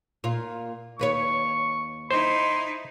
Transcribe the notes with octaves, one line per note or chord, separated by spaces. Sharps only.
A#2 F4
D#2 B4 C#5 C#6
D#4 E4 C5 C6